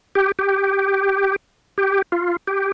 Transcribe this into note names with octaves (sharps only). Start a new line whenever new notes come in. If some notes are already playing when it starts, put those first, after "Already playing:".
G4
G4
G4
F4
G4